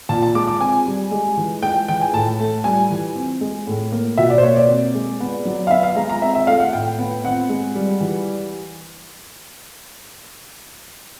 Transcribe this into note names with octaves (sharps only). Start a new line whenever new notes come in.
A#2 A5
A5
G#3 D6
D6
C4 G#5
G3
G#3
E3
G#3 G5
E3 G5
G#5
A2 A5
A3
G3 G#5
E3
C4
G#3
A2
A#3
B2 E5
D5
C5
A#3 C#5
D5
C4
G#3
B3
F#3
F5
B3 E5
F5
G#3 A#5
A#5
C4 E5
E5
A3 F5
F#5
A2 G5
B3
C4 F#5
G#3
G3
E3